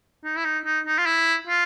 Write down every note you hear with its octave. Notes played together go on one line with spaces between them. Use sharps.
D#4
E4
D#4
D#4
D#4
F4
E4
F4